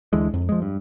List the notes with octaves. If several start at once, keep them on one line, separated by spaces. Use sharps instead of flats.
D2 D3 E3 G#3
F2
F3 G#3
G2